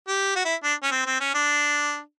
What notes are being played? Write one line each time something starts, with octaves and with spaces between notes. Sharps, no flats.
G4
F#4
E4
D4
C#4
C4
C4
C#4
D4